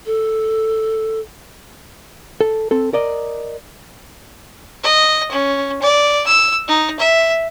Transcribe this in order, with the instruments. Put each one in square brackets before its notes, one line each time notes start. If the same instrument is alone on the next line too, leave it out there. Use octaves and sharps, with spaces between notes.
[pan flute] A4
[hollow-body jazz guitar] A4
C4 A4
A#4 D5 D#5
[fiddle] D#5
C#4
D5
E6
D#4
E5